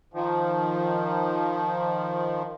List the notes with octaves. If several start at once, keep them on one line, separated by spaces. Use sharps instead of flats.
D#3 F3